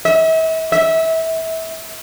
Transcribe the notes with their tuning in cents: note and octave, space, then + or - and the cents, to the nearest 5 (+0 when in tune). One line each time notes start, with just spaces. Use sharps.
E5 -40
E5 -25